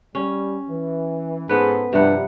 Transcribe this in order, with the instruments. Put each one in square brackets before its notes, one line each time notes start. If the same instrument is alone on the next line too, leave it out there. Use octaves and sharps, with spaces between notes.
[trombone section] G3 [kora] C#4
[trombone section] E3
[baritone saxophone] G#2 [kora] B3 B4 [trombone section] G#4 A4 C5
[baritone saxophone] G2 [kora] C3 F#5 [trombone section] F3 G3